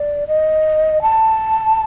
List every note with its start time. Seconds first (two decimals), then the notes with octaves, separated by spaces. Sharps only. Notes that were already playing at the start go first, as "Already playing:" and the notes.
Already playing: D5
0.27 D#5
1.02 A5